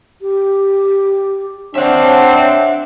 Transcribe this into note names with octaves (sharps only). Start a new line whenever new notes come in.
G4
C4 D4 C#5 E5 F#5